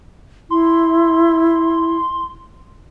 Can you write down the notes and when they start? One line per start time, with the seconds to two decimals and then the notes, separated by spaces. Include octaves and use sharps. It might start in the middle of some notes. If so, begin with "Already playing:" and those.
0.50 E4 C6